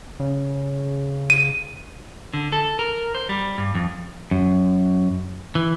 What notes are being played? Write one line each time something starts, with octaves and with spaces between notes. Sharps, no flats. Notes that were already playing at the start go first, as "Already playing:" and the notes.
C#3
D#7
D3
A4
A#4
C5
G3
G2
F2
F#2
E3